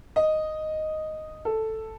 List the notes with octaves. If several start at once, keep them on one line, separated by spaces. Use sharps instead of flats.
D#5
A4